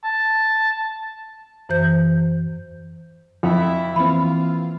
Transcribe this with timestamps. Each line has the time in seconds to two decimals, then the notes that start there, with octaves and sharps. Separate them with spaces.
0.04 A5
1.69 F#2 E3 C5 G6
3.43 F2 E4 G5
3.96 E3 A#3 C4 F4 B5